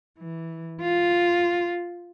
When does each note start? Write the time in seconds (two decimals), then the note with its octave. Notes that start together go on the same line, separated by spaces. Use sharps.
0.19 E3
0.81 F4